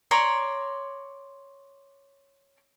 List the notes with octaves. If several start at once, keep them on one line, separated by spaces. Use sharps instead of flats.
C#5 D5 A#5 C6